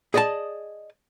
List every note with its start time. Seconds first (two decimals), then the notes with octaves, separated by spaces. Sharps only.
0.14 G#4 D5 D#5 F#5 A5